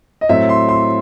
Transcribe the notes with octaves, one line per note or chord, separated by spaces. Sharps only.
D#5
A2 F#3 C4 E5
C6
C6